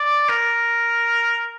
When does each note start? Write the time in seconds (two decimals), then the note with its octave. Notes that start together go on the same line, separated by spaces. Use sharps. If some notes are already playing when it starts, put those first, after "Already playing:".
Already playing: D5
0.29 A#4